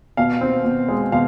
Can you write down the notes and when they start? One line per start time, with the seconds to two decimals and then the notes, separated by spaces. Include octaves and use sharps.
0.17 B2 F5
0.41 C4
0.65 B2
0.88 G#3
1.12 B2 F5